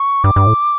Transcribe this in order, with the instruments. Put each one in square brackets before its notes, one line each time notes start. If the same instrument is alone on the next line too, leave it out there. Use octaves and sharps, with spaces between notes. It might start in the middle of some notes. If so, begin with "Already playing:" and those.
Already playing: [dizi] C#6
[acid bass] G2 [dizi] D6
[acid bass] G2
A2